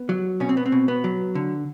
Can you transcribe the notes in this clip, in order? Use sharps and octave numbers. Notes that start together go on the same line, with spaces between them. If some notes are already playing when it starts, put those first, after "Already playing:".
Already playing: B3
F#3
B2 C#4
C4
B3
C4
B2
B3
F#3
D3